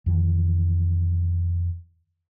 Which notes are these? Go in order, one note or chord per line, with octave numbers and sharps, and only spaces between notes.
F2 D#3 E3